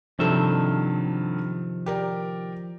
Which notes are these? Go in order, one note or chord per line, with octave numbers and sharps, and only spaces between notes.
G2 C3 D#3 F3 F#3 A4 E5
G4 A#4 D5